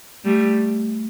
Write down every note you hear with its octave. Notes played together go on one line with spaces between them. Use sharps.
G3 A3